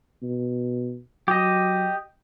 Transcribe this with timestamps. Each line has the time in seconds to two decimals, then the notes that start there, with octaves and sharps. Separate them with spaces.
0.22 B2
1.28 F#3 G4 D#5